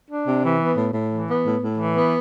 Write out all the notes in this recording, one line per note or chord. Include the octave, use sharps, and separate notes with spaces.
D4
C3
E3
B3
A2
A2
E3
B3
A2
A2
E3
B3